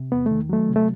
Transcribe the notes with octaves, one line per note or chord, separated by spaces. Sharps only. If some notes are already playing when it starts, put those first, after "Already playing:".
Already playing: C3
E2 B3
D#3 A3
F#3 A3
C3
A3